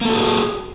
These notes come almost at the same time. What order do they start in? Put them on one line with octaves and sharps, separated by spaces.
A#3 A4 F#4 G#4